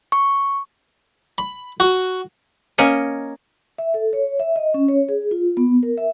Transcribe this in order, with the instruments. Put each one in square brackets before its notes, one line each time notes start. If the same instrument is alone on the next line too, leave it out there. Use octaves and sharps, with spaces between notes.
[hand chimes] C#6
[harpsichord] B5
F#4
[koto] A#3 C#4 C#5 D#5
[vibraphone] E5
A4
C#5
E5
D#5
C#4
C#5
G#4
F4
B3
A#4
E5